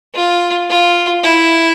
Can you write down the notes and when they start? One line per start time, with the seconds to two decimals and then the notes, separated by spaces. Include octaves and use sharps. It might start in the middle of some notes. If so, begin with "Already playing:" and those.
0.15 F4
0.70 F4
1.24 E4